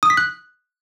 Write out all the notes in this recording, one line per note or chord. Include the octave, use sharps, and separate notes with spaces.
D#6
B6
F#6